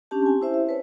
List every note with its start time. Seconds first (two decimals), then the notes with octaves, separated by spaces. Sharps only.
0.11 C#4 D4 G4 A5
0.23 C4 G#5
0.42 E4 C5 E5
0.54 E5
0.69 B4 C#5